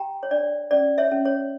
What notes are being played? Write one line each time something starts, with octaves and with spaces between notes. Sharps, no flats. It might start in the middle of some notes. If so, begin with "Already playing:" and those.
Already playing: G4 G5 A#5
C#5
D4 D5
C#4 D5
C#5 E5
C#4
C#5